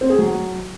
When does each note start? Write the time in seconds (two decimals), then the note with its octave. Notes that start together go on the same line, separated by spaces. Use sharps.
0.01 C4
0.10 G#4
0.18 F#3